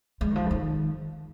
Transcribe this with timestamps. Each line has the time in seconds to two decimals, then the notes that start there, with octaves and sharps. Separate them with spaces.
0.21 G#3
0.30 D#3
0.36 F3
0.46 C#3
0.51 D#3